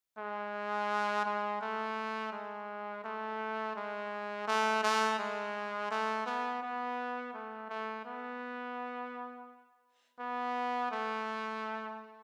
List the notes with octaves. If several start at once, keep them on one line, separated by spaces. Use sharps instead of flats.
G#3
G#3
A3
G#3
A3
G#3
A3
A3
G#3
A3
B3
B3
A3
A3
B3
B3
A3